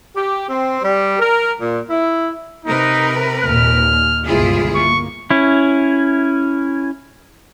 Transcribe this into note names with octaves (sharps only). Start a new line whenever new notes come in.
G4
C4
G3
A#4
A#2
E4
C3 D#4 A#4 B4
D#2 A#2 F6
G1 C#2 B2 E4 F4 G#4
A#3 C#6
C#4 E4